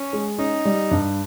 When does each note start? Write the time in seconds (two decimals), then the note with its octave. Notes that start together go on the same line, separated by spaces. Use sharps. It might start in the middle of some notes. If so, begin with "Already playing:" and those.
Already playing: C#4
0.13 G#3
0.38 C#4 D#4
0.65 G3
0.91 G2